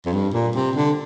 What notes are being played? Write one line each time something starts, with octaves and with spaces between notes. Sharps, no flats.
F2
G2
A#2
C3
D3